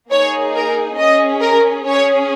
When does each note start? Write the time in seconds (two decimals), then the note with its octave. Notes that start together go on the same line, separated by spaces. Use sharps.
0.11 A#3 D#4 G#4 C#5
0.55 A#4
0.98 C#4 G#4 D#5
1.42 A#4
1.86 C#4 G#4 C#5